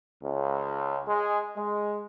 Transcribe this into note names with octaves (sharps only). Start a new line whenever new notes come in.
C#2
G#3
G#3